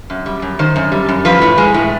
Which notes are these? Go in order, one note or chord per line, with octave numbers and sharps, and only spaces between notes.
F#2
G3
F#2
D#3 C5
F#2
G3
F#2
F3 B4
A2
G#3
A2